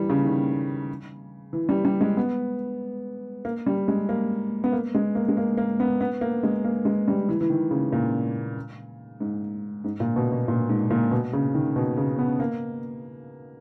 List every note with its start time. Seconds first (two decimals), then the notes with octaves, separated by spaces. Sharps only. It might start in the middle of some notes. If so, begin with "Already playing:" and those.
Already playing: E3 G3
0.09 C#3
0.25 D#3
1.53 E3
1.69 G3
1.85 G3
2.01 G#3
2.17 B3
3.45 A#3
3.66 G3
3.88 G#3
4.09 A#3
4.64 B3
4.72 A#3
4.95 G#3
5.15 A#3
5.28 G#3
5.37 A#3
5.58 A#3
5.80 B3
6.01 B3
6.21 A#3
6.43 G#3
6.65 A#3
6.85 G#3
7.08 G3
7.29 E3
7.41 E3
7.50 D#3
7.71 C#3
7.92 A#2
9.20 G#2
9.84 G#2
10.00 A#2
10.16 B2
10.32 B2
10.48 A#2
10.69 G#2
10.90 A#2
11.11 B2
11.33 C#3
11.55 D#3
11.76 B2
11.97 C#3
12.19 B3
12.40 A#3